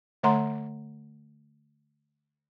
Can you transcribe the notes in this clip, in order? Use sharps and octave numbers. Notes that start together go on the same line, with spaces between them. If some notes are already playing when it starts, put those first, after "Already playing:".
D3 A3 C#5 F#5 A#5 C6